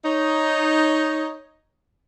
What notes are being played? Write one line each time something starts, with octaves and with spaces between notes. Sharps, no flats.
D#4 C#5